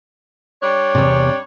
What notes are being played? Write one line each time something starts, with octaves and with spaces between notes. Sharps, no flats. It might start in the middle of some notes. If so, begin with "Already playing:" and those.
G3 D4 C#5
E2 C3